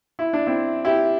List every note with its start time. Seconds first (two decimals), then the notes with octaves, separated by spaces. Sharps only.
0.19 E4
0.33 D4
0.47 C4 E4
0.85 E4 G4